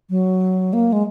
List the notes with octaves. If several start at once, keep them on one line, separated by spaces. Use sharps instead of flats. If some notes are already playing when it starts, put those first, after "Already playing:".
F#3
A#3
G#3